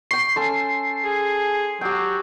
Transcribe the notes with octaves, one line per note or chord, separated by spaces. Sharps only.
G5 C#6 C7
C#4 A4 C6
G#4
F#3 G4 G5